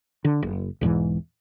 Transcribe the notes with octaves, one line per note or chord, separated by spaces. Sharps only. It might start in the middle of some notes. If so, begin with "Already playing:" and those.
D3
F#1
B1 E2 G#2 E3